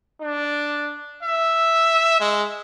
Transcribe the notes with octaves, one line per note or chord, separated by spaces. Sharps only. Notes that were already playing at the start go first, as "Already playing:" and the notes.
D4
E5
G#3